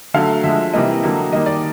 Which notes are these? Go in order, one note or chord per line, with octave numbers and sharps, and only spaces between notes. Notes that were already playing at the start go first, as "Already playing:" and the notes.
D3 F#3 A3 F5
D3 F3 G#3 E5
C3 E3 G3 A#3 D#5
D3 F#3 A#3
D#3 G3 A#3 D#5
D5